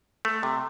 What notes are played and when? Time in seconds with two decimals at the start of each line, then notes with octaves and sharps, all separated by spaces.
0.25 A3
0.43 C3